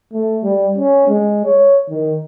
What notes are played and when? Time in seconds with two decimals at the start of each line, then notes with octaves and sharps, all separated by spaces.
0.13 A3
0.43 G3
0.78 C#4
1.07 G#3
1.45 C#5
1.90 D#3